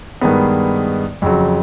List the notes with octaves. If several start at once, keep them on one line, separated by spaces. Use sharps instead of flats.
G2 D#3 G#3 B3
F2 C#3 F#3